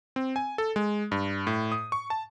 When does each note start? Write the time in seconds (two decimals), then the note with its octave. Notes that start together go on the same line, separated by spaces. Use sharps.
0.16 C4
0.36 G#5
0.58 A4
0.76 G#3
1.12 G2
1.47 A2
1.72 D#6
1.92 C#6
2.10 A5